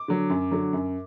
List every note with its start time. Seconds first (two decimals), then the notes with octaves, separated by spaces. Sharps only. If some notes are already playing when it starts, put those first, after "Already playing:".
Already playing: D6
0.08 D3 F#3
0.30 F#2
0.51 D3 F#3
0.73 F#2